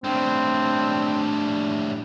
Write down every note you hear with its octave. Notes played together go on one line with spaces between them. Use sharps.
A2 G3 C4 D4